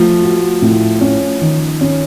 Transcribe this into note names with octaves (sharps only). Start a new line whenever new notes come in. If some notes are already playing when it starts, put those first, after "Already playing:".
Already playing: F3 A3
F#4
A2
C#4
D#3
C#4